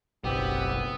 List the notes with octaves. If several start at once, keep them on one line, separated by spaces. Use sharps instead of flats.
F#1 B1 B3 C4 G4